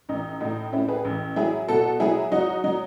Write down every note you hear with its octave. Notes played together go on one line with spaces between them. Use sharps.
A1 D#4
A2 D#4
A2 C#4 E4
G#4 B4
A1
F#3 E4 G#4
B2 F#4 A4
F#3 E4 G#4
F#3 D#4 F#4
F#3 D#4